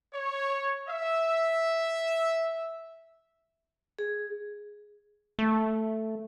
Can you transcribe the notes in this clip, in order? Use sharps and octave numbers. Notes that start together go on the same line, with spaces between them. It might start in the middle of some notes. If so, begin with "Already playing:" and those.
C#5
E5
G#4
A3